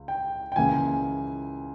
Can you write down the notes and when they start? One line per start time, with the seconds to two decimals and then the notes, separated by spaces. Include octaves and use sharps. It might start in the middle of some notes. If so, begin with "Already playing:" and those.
Already playing: C#2
0.08 G5
0.52 G5
0.56 C#2 C#3 E3 A#3 G#5